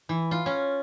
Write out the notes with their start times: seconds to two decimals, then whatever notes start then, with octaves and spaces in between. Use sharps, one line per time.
0.09 E3
0.31 F4
0.46 C#4